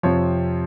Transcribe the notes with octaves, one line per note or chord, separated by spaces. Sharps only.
F2 C3 F3 C#5